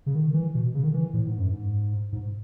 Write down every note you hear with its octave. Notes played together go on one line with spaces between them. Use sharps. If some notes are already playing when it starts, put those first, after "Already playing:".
C#3
D#3
E3
B2
C#3
D#3
E3
A2
G#2
F#2
G#2
G#2